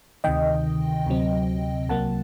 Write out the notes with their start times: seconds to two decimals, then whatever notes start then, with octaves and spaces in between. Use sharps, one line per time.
0.24 D2 C3 D#3 D#5 G5
1.06 D2 C3 F#3 C4
1.89 C2 C3 F#3 A#3 F#5 A5